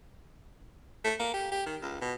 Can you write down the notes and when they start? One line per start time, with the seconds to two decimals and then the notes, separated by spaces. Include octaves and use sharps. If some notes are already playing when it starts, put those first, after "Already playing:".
1.04 A3
1.20 A#3
1.34 G4
1.52 G4
1.66 D#3
1.82 C#2
2.01 B2